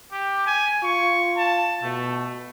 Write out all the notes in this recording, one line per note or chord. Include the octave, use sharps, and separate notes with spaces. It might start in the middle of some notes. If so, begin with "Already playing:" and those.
G4
G#5
F4 C#6
A5
B2 A3